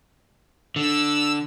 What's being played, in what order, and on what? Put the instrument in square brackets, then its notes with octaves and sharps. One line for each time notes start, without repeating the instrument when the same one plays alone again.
[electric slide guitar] D3 [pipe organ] E6